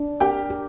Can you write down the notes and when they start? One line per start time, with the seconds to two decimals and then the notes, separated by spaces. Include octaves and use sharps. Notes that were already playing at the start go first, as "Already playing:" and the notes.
Already playing: D4
0.20 G4 A#4 G5
0.50 G4